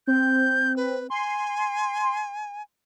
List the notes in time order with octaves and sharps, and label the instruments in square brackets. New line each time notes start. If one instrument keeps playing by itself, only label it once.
[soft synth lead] C4 [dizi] G6
[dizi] B4
[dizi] G#5 [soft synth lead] C6